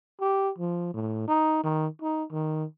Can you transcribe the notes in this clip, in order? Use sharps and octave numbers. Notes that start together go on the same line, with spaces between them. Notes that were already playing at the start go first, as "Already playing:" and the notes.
G4
F3
A2
D#4
D#3
D#4
D#3